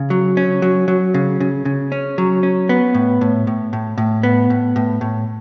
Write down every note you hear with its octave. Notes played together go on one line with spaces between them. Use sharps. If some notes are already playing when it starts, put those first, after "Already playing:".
Already playing: C#3
F#3
C#4
F#3
F#3
C#3
C#3
C#3
C#4
F#3
C#4
B3
A2
A2
A2
A2
A2
B3
A2
A2
A2